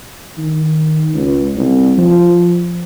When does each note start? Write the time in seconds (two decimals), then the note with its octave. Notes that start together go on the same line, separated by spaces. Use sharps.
0.38 D#3
1.13 C#2
1.56 C2
1.98 F3